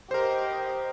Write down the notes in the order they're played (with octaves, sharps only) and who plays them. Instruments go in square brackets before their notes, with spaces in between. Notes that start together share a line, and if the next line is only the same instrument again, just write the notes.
[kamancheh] G4 D#5 [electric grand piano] A#4 C5